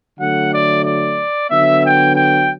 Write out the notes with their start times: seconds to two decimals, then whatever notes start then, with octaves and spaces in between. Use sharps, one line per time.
0.19 D3 F#3 A3 F#5
0.52 D5
0.85 D5
1.50 D3 F#3 B3 E5
1.84 G5
2.16 G5